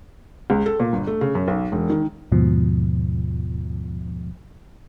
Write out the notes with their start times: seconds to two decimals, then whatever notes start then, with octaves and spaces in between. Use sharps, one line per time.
0.50 C#2
0.66 A4
0.80 A#2
0.93 G1
1.07 A3
1.21 C#3
1.35 F#2
1.48 B1
1.72 E1
1.90 D#3
2.32 D#2 G#2 B2 F3